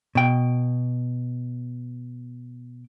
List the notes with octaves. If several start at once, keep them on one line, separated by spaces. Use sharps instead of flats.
B2 G5